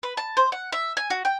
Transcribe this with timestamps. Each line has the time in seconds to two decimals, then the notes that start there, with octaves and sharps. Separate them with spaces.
0.03 B4
0.17 A5
0.37 C5
0.52 F#5
0.72 E5
0.97 G#5
1.10 F#4
1.25 G5